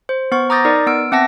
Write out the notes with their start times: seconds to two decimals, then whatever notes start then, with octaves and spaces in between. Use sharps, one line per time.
0.09 C5
0.32 B3 C5 C#6
0.50 A#5 D6 D#6 G6 A6 A#6
0.65 D#4 A#4 D5
0.87 B3 E6 D7
1.12 C4 E5 F#5 A5 A#6